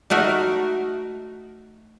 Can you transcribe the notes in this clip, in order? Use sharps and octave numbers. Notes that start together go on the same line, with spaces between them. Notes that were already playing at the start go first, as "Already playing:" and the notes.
A3 D#4 F#4 A#4 E5